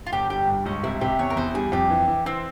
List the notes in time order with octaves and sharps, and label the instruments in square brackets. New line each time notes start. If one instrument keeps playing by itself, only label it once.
[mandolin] F4
[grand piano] G1 [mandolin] G4
[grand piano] G3 [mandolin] G4
[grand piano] G2
[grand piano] C#2 [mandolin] C#4
[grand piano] C3 [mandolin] E4
[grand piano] C3 [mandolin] G4
[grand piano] E2 [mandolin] C#5
[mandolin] A#4
[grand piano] E2 [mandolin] C5
[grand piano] G3 [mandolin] G#4
[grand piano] F2 [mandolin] G4
[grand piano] E3
E3
[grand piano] E3 [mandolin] C4